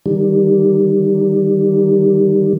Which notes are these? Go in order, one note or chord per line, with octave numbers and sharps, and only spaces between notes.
D#3 G3